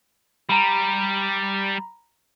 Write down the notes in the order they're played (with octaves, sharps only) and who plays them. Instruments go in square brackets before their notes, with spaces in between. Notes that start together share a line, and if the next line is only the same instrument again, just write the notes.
[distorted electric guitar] G3 [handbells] A#5 B5